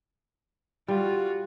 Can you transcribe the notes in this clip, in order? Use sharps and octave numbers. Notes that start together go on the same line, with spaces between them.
G3 F4 F#4